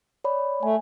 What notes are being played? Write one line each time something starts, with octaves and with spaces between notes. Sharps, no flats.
C#5 D5 B5
A3 G#5